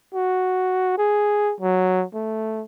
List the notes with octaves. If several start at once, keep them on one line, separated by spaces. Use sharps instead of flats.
F#4
G#4
F#3
A3